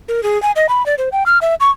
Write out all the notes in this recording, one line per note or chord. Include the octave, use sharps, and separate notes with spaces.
A#4
G#4
G#5
D#5
B5
D5
C5
G5
F6
E5
C#6